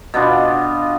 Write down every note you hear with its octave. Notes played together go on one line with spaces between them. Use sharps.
B2 B3 D4 F4